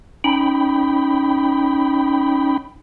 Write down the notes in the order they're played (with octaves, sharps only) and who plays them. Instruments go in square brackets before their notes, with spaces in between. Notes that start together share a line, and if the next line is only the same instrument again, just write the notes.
[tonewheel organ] C#4 D#4 G5 B5